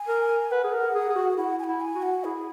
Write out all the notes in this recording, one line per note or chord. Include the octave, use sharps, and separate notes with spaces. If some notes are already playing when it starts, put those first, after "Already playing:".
Already playing: G#5
A#4
B4 F#5
G#4
A#4
G#4
G#4
F#4
E4 F#5
G#5
E4 F#5
G#5
F#4
F#5
E4 G#4